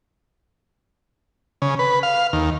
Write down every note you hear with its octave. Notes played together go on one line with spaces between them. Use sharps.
C#3
B4
F5
D#2